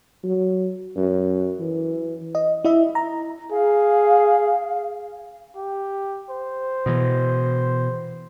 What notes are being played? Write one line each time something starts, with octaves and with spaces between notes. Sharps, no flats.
F#3
F#2
E3
D#5
E4 D#5 E5
A#5
G#4 F5
G4
C5
B2 E3